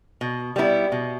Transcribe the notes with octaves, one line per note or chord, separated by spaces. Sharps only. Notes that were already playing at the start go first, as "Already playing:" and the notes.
B2
G3 B3 E4
B2